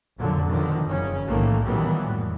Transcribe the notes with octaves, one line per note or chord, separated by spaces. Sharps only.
F1 F2 A#2 D3 F#3
B2 D3 D#3 F3
F#1 C#3 C#4
B1 A2 D#3 E3 A3 A#3
A#2 D#3 E3 F#3 G3 B3
F2 A2